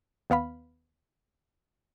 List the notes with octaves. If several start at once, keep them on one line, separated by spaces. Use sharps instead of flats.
D#2 B3 F5 B5